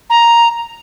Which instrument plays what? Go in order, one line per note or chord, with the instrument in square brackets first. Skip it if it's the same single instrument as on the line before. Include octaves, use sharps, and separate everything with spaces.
[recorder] A#5